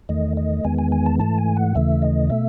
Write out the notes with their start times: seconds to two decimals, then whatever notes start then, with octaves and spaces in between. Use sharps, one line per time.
0.09 E2 D#3 A3 D#5
0.37 D#5
0.64 E2 D#3 G#3 B3 G#5
0.78 G#5
0.92 G#5
1.06 A5
1.19 G#2 E3 A3 A5
1.38 G#5
1.57 F#5
1.75 D#2 C#3 E3 A3 E5
2.02 D#5
2.30 B2 A3 E5